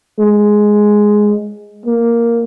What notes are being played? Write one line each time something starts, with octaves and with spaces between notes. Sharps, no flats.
G#3
A#3